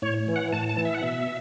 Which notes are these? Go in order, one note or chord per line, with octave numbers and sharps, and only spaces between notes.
A2 C#5
E3
F#5
A2 A5
A5
E3
E5
F#5
B2 E5